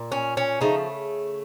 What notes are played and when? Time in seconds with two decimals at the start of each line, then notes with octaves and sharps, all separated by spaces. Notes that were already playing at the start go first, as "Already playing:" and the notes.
Already playing: A#2
0.12 C#4
0.37 C#4
0.61 C#3 F3 A3 D#4